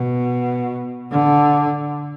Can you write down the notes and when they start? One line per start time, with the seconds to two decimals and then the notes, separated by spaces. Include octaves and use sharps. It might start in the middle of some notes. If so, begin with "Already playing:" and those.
Already playing: B2
1.11 D3